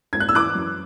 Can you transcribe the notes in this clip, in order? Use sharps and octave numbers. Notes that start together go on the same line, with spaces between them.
G#1 G#6
F#6
E6
E3 D6 F#6
F#2